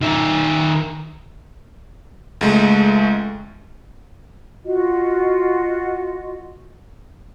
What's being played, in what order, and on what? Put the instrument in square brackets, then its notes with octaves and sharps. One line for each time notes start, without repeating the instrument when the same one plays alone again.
[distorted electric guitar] D#3 E5
[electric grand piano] C#2 G#3 A3
[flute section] F4 F#4 D#5